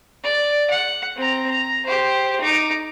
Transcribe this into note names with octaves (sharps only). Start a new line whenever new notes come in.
D5
F#5
C4 A#5
A#5
G4 C5
D#4 D6